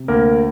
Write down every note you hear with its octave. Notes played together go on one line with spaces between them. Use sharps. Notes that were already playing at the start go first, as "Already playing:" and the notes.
Already playing: C3
D2 A#3 A#4